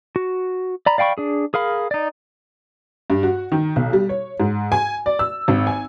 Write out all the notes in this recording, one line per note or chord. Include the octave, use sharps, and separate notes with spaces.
F#4
D5 A#5 B5
D5 F5 G5 B5 C#6
D4 G#4
G#4 A#4 F5 B5
D#4 D5
G2
F#4
D#3
B1
G3
C#5
G#2
G#5
D5
E6
G#1
G#5